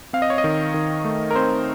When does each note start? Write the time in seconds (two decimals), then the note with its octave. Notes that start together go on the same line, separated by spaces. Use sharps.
0.13 C4 F5
0.22 D#5
0.30 C#5
0.38 D#5
0.44 D#3
0.74 D#3
1.05 A3
1.31 A#4
1.35 C4 C5